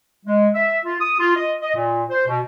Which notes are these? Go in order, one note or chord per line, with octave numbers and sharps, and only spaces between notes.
G#3
E5
F4
D#6
F4
D#5
D#5
A#2
C5
B2